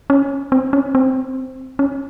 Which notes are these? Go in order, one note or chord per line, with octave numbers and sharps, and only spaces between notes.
C#4
C4
C#4
C4
C#4